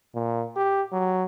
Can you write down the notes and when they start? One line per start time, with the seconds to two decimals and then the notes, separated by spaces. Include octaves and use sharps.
0.15 A#2
0.56 G4
0.92 F#3